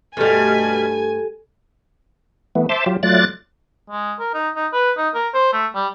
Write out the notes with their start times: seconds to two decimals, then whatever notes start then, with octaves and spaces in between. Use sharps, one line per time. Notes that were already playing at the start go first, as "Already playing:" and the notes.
0.17 G2 B2 G3 A3 G4 A4 G#5
2.55 E3 A3 B3
2.69 C5 E5 A5 C6 D6
2.86 F#3 F4 G4
3.03 F#3 A3 F4 D5 F#6 A6
3.90 G#3
4.19 A#4
4.34 D#4
4.55 D#4
4.73 B4
4.97 D#4
5.14 A#4
5.34 C5
5.53 A3
5.75 G3